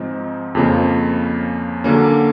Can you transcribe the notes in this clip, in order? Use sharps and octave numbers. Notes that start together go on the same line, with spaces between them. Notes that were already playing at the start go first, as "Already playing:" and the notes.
Already playing: G#2 F3 G#3 C4 D#4
F2 C#3 F3 A#3 C#4
D3 F#3 A#3 C#4